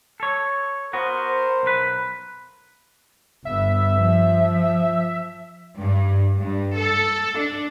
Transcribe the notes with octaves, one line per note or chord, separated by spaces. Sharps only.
A4 C#5
B3 F#4 A#4 C5
B1 B4
G1 B3 E5
F3
G2
G2
A4
D4